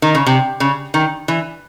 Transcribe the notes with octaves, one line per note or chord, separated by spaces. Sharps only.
D#3
C#3
C3
C#3
D#3
E3